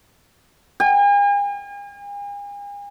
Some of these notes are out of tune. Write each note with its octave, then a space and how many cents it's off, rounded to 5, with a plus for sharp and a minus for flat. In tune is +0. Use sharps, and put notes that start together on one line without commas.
G#5 -45